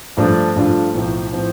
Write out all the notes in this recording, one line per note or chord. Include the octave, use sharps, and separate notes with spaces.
G2 F3 A3 D4 F4
G2 F3 A3 D4 F4
B1 A2 F3 C4
A2 F3 C4